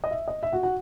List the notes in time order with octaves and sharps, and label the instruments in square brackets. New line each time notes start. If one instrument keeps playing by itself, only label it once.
[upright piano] D#5
E5
D#5
E5
F#4 F#5
F#4 F#5